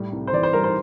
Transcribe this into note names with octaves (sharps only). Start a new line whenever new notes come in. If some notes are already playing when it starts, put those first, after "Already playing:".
Already playing: A2 G3
C2
C5
E3 D5
C5
G3 A#4
C5